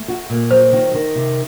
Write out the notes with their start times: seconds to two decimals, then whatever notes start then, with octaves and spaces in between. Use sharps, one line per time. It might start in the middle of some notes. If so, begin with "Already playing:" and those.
Already playing: A3
0.08 F#4
0.30 A#2
0.51 F#3 C5
0.72 D#3
0.94 D#3
1.15 C3